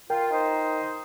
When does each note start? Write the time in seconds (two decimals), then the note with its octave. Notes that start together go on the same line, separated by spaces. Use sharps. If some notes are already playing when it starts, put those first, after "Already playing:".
0.10 F4 A#4 G5
0.31 D#4 C5